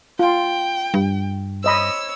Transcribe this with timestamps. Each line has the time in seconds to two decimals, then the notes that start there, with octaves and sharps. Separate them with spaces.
0.19 F4 G5
0.94 G2
1.64 C5 C#5 D#5 B5 E6